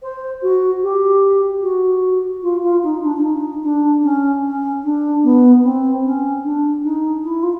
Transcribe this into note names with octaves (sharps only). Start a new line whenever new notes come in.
C5
F#4
G4
F#4
F4
F4
D#4
D4
D4
D#4
D4
C#4
C#4
D4
B3
C4
C#4
D4
D#4
E4
F4